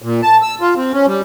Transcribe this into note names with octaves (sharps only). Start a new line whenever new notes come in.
A#2
A5
E6
F4
C4
C#4
G3